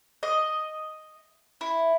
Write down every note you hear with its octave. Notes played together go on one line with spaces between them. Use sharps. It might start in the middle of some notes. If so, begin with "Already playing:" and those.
D#5
E4